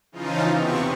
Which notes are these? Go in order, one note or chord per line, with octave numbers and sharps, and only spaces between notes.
C#3 E3 F3 D#4 F4
E2 C3 B3 C4 C#6